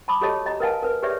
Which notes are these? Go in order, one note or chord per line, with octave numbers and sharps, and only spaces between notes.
A5 B5 D6 D#6
F#4 G4 A4 C#5 D#5 A5
D#5 A#5
A#4 B4 D#5 F5 G#5 A5
A#4 B4
G4 G#4 B4 C#5 D5 E5